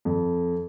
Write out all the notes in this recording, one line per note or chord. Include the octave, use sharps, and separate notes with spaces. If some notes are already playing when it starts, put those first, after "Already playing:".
F2